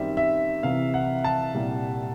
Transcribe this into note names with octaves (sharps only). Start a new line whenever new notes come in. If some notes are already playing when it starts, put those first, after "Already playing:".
Already playing: F#2 D#3 G3 C4 E5
E5
C2 C3 E3 F5
F#5
A5
C2 A#2 G3